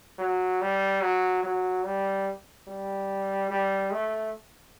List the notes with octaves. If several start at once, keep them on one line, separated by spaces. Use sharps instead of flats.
F#3
G3
F#3
F#3
G3
G3
G3
A3